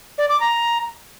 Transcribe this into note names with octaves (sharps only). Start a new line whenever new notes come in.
D5
D6
A#5